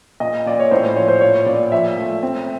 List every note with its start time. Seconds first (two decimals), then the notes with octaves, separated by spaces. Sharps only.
0.20 A#2 D#5
0.46 A#2 D5
0.60 C#5
0.71 A2 C5
0.84 C5
0.96 F3 C#5
1.08 C5
1.21 A#2 C#5
1.46 A#2 D5
1.72 F3 E5
1.98 A3
2.23 C4